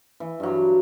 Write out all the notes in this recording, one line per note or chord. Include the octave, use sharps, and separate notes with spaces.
E3
G2 F#3